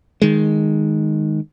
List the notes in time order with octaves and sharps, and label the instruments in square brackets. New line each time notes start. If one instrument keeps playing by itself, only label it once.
[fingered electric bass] D#3 G#3